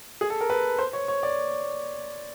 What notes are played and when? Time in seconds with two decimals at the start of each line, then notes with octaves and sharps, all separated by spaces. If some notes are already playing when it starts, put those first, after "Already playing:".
0.21 G#4
0.30 A4
0.41 A#4
0.50 B4
0.79 C5
0.93 C#5
1.08 C#5
1.23 D5